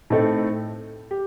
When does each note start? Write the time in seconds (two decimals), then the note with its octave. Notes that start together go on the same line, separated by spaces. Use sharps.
0.10 A2 A3 C4 D#4 A4
1.11 G4